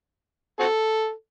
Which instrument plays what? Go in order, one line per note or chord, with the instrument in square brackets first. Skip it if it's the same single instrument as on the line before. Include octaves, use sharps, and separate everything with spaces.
[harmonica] C4 F#4 A4